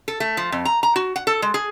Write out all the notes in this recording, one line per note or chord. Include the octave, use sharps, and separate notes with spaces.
A4
A3
F3
F2
A#5
A#5
F#4
F#5
A4
G#3
G#4